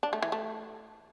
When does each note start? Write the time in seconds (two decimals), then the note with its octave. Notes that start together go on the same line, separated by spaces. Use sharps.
0.03 D4
0.13 A3
0.22 E3
0.32 A3